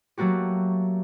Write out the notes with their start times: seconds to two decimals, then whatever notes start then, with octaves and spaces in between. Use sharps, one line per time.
0.17 F#3 A3 A#3 F#4 G4